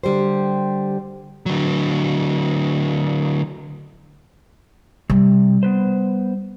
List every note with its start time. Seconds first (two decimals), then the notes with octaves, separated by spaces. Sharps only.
0.03 D3 G3 G4 C5
1.46 D3 F#3
5.10 C3 G3
5.63 B3 B4 C5